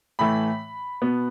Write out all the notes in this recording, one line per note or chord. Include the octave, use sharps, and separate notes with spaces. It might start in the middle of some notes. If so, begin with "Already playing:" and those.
A2 E3 A3 B5
B2 B3